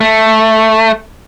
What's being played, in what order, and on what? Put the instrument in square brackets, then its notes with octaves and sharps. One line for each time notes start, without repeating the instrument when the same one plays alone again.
[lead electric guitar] A3